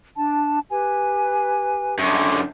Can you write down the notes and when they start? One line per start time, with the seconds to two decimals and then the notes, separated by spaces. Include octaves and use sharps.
0.17 D4 A5
0.69 G4 B4 G#5
1.99 F#2 D3 C#6